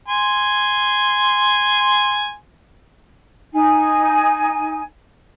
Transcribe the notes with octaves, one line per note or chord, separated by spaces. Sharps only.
G#5 C6
D#4 G#5